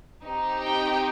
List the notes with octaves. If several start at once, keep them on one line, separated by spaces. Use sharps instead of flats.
C4 D#4 G4
G5